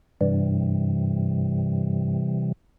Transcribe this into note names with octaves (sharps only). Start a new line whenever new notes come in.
G2 C3 E3 G3